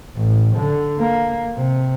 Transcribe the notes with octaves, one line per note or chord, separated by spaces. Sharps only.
A1
D3
A#3
C3